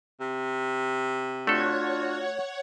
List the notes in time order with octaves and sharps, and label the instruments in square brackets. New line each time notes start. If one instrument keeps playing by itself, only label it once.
[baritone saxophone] C3
[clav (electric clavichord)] A3 A4 [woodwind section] D4 F4 F#4 [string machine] C#5 F#5 G#6